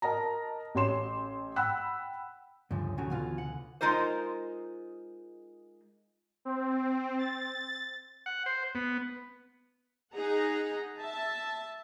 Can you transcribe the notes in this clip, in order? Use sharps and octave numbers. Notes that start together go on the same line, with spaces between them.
A#4 D#5 A5 A#5
A1 G4 C#5 C6 E7
F#5 G5 B5 E6 F#6
D2 G2 C#3 F3
A2 C#3 F#3 G#5
B2 E3 F4
F#5
G#3 D#4 F4 A#4 C5
C4
A6
F#5
C5
B3
D#4 G#4 F#5 A#5
E5 A5